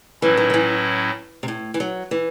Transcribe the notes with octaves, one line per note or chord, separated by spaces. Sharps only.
A2 E3 F#3 C#4 E4
D#3
D#3
E3
C3
A2
E3
F#3
E3